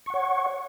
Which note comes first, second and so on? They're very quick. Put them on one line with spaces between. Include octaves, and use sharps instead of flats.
C#6 F#5 C#5